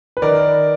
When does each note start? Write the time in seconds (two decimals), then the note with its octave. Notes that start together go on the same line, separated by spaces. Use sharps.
0.17 B4
0.22 D#3 A#4 D5